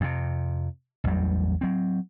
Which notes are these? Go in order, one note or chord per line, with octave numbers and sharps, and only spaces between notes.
F2 C3
A1 E2 F#3 G3
F#3 C4